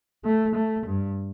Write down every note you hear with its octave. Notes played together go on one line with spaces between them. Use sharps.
A3
A3
G2